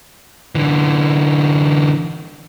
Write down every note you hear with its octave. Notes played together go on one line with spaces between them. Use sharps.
D3 E3